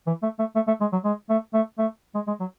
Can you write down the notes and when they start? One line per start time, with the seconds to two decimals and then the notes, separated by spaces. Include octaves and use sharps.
0.07 E3
0.23 A3
0.39 A3
0.55 A3
0.67 A3
0.81 G#3
0.92 F#3
1.04 G#3
1.30 A3
1.54 A3
1.79 A3
2.15 G#3
2.27 G#3
2.40 F#3